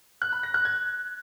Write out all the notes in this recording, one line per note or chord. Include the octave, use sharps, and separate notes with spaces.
F#6
B5
A#6
F#6
G#6